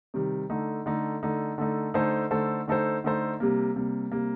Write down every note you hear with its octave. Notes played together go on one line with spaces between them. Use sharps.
C3 D#3 G3
D3 A3 D#4
D3 A3 D#4
D3 A3 D#4
D3 A3 D#4
D3 A3 D#4 A4 C5
D3 A3 D#4 A4 C5
D3 A3 D#4 A4 C5
D3 A3 D#4 A4 C5
C3 G3 A#3
C3 G3 A#3
C3 G3 A#3